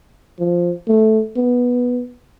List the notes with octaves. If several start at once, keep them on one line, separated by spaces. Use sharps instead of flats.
F3
A3
B3